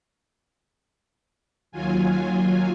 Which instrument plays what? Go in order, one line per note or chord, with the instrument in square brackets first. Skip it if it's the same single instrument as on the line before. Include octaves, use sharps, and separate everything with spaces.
[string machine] D#2 F#3 F4 G#5